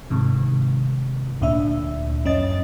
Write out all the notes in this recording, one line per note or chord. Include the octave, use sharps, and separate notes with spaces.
G#2 C3 D#3
D2 A#2 D4 E5
F#2 C#4 D#5 A6